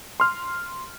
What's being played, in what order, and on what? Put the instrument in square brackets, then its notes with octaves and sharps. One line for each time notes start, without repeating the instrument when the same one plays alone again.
[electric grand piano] C6 F6